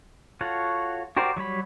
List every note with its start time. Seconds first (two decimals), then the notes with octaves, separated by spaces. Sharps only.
0.41 F4 F#4 A4 C#5 F#5
1.17 F#4 G4 A#4 C5 D5
1.37 F#3 G3 C#5 B5